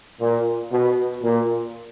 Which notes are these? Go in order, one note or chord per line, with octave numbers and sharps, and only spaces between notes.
A#2
B2
A#2